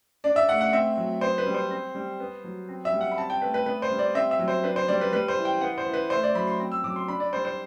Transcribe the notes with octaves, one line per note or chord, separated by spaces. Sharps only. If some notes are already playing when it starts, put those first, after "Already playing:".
D4 D5
E5
A3 F#5
F#5
C4 E5
F#3
B3 C5
B4
G3
C5
C4
G3
B3
F#3
C4
E5
G3
F#5
B5
C4 A5
G5
A3 B4
B4
B3 B4
C5
G3
D5
C4 E5
E5
F#3
C5
D4 B4
C5
G3 D5
B4
G3 B4
C5
E3
G5
B3 F#5
C5
E3
B4
A3 C5
D5
F#3 B5
C6
C4
E6
F#3 D6
C6
D4 B5
D5
G3 C5
C5